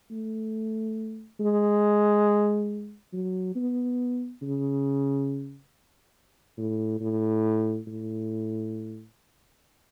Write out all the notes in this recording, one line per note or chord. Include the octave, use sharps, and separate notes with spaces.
A3
G#3
F#3
B3
C#3
A2
A2
A2